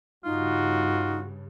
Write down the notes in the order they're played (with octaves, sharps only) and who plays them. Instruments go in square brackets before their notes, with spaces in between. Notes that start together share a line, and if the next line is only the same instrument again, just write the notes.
[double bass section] G2 C#3 [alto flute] D#4 [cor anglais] F4 [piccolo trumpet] F#4